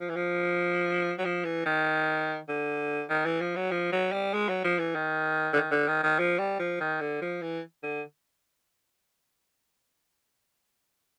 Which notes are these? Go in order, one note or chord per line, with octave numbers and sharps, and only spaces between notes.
F3
E3
F3
F#3
F3
E3
D#3
D3
D#3
E3
F3
F#3
F3
F#3
G3
G#3
F#3
F3
E3
D#3
D3
D#3
D3
D#3
D#3
F3
G3
F3
D#3
D3
F3
E3
D3